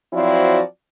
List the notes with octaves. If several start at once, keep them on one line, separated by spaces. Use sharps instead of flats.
F3 F#3 C4 E4 F#4 D5